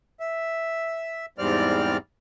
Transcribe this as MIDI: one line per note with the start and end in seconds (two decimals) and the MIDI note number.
0.20 1.26 76
1.38 1.97 40
1.38 1.97 44
1.38 1.97 55
1.38 1.97 60
1.38 1.97 74
1.38 1.97 89